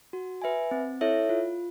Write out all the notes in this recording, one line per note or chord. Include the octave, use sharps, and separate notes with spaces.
F#4
B4 E5 G#5
C4
E4 A4 C#5 E5
F4